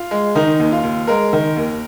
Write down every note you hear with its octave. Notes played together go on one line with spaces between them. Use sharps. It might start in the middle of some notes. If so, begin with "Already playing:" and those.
Already playing: F4
G#3
D#3 D#4
D#2
F4
D#2
G#3 A#4
D#3
D#2